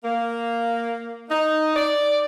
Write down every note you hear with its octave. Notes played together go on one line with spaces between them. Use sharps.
A#3
D#4
D5